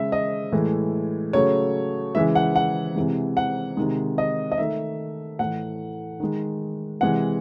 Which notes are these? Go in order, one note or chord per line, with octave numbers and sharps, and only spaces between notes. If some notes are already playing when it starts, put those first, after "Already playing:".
Already playing: C#3 G#3 E5
D#5
A2 E3 G#3
C#3 F#3 A3 C#5
C#3 E3 G#3 E5
F#5
F#5
C3 E3 G#3
F#5
C3 D#3 G#3
D#5
D#5
D#3 A3 E5
A2 E3 A3 F#5
D#3 G#3
C3 E3 G#3 F#5